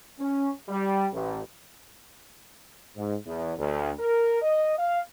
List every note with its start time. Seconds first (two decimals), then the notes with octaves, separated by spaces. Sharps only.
0.19 C#4
0.69 G3
1.13 A1
2.97 G#2
3.26 E2
3.58 D2
3.99 A#4
4.42 D#5
4.78 F5